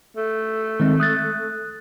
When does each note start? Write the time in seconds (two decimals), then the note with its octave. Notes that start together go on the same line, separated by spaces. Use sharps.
0.17 A3
0.80 D#3 G#3 C4
1.00 D#6 F#6 A6